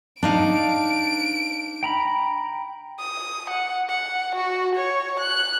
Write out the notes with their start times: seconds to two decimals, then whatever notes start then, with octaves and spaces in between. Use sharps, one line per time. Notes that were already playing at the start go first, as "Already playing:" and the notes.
0.23 D4 D#4 F5 D7
1.83 G5 A#5 B5
2.99 D#6
3.50 F#5
3.89 F#5
4.36 F#4
4.76 C#5
5.20 F#6